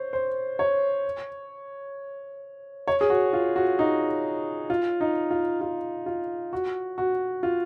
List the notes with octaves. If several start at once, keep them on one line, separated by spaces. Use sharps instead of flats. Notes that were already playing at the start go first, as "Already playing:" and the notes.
Already playing: C5 C#5
C5
C#5
C#5
G#4
F#4
F4
F#4
D#4
F4
D#4
F4
F4
F4
F#4
F#4
F4